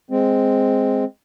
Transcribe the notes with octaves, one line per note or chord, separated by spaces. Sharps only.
G#3 C4